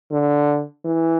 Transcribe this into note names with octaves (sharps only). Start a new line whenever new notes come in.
D3
E3